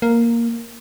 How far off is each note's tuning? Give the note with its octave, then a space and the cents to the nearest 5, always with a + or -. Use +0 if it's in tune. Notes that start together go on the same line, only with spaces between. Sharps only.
A#3 +0